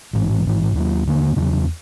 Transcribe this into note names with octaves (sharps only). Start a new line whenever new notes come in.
A1 G#2 E3
A1 G#2 E3
D#2 D3 F#3 A#3
D#2 D3 F#3 A#3
E2 C#3 F#3